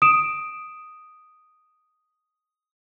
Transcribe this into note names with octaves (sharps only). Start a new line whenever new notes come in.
D#6 D7 E7